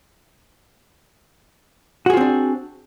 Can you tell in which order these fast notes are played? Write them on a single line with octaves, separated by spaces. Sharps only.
F#4 G#4 F4 C4 D4